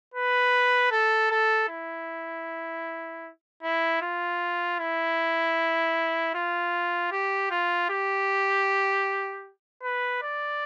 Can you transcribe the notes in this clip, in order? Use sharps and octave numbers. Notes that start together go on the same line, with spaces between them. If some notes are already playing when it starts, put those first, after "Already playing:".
B4
A4
A4
E4
E4
F4
E4
F4
G4
F4
G4
B4
D5